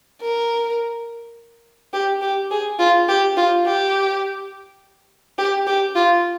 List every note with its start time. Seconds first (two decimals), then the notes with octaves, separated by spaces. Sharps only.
0.21 A#4
1.93 G4
2.22 G4
2.51 G#4
2.79 F4
3.08 G4
3.37 F4
3.66 G4
5.38 G4
5.67 G4
5.95 F4